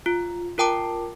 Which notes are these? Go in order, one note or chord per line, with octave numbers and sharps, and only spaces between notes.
F4
F4 A#4 G5 A5 D6